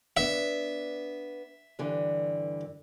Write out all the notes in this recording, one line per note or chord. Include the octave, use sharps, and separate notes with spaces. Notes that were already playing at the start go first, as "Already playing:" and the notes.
B3 D4 E5
G2 D3 E3